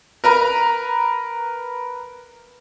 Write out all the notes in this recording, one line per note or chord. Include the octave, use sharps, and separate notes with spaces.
A#4 B4 A#5